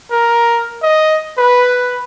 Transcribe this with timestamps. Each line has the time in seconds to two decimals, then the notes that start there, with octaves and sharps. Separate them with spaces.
0.12 A#4
0.83 D#5
1.38 B4